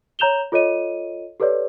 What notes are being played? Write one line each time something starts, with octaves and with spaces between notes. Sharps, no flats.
C#5 A#5 G6 E7 F7 G7
F4 A4 C#5 D#5 D#7
G4 A4 B4 C#5 D5